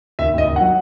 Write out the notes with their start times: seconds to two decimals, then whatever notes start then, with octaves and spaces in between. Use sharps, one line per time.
0.19 D#2 E5
0.34 D#2 D#5
0.47 D#2
0.56 F#3 F#5